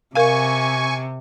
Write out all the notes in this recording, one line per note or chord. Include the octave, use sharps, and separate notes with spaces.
C3 A#4 F5 G#5 C#6